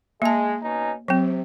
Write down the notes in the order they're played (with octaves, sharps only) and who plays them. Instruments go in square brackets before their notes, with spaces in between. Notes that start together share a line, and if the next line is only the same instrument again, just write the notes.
[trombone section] G#3 [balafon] A#3 A5
[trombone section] B2 C#4 D#4
[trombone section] C3 [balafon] F#3 C4